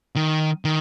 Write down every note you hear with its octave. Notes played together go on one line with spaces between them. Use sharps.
D#3
D#3